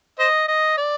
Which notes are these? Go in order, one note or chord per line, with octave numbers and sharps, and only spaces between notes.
C5 D#5
D#5
D5